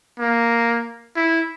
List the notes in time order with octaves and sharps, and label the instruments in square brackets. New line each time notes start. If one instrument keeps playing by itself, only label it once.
[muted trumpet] A#3
E4